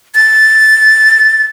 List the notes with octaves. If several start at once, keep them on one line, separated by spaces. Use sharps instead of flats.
A6